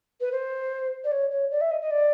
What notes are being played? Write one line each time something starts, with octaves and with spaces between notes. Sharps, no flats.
B4
C5
D5
C#5
C#5
D5
E5
D#5
D#5
D5